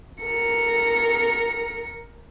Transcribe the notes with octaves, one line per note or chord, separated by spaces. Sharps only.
A#4 C#7